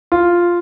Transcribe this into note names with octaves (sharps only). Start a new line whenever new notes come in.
F4